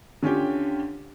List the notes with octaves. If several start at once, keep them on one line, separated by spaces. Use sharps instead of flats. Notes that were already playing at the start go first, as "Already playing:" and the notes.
D3 C#4 F4 G4 G5